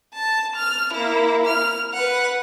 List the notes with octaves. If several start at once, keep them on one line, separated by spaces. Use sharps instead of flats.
A5
F6
A#3 E4
F6
B4 F#5